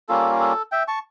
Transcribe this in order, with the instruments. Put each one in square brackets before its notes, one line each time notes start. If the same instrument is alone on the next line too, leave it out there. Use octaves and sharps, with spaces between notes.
[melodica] G3 A#3 C#4 F4 A4
A4
E5 G5
A5 C#6